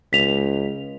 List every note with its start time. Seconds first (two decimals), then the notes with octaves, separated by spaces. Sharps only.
0.13 C#2 B6 F7